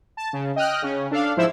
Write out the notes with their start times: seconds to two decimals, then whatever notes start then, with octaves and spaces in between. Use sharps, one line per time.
0.17 A5
0.33 C#3
0.56 D#5 G5 D#6 F6 F#6
0.82 C#3 C#4
1.11 D4 A4 F5
1.36 G#2 F3 E4 C5 E6